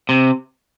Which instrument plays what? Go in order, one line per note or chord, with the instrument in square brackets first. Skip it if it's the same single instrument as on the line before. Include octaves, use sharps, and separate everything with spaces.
[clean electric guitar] C3